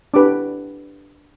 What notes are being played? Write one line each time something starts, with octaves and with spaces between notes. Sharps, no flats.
D4 G4 B4 D6